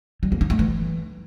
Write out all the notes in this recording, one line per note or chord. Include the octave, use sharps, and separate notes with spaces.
G3
A#3
D#4
A3
E3